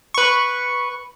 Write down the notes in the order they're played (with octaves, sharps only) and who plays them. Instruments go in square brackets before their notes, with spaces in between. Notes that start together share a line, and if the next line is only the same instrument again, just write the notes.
[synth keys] B4 C#6